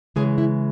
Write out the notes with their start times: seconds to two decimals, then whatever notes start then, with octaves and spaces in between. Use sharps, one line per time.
0.16 C#3 E3 G#3 G#4
0.38 E4